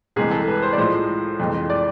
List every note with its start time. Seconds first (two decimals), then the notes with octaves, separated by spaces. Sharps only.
0.16 C2 C3 E3 G#3 G#4
0.31 A4
0.48 B4
0.62 C5
0.73 D5
0.77 A2 F3 G#3 C5
1.40 F2 C3 E3 G#3
1.70 D5